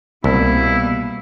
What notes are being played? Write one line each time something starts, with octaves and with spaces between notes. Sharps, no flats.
C2 B2 G3 A#3 E4